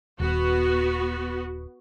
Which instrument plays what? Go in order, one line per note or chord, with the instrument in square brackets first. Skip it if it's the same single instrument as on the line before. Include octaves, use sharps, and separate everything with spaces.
[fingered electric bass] D#1 [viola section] B3 F#4